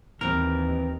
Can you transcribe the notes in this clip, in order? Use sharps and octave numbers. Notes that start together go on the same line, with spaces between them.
D#2 E3 C4 A#4